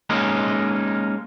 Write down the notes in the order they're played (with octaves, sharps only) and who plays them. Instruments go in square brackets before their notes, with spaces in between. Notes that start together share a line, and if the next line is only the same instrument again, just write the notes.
[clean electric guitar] G#3 A#3 C#4 D#4